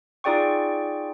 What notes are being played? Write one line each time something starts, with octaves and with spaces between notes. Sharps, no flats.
D#4 F4 G#4 D5 G5 C#6